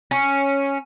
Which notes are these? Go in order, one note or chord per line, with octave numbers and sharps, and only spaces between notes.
C#4